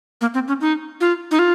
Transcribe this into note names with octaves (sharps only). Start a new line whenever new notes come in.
A#3
C4
C#4
D#4
F4
D#4
F4